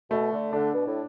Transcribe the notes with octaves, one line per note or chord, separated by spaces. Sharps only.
B2 A3
D3
D3 D4
B2
A2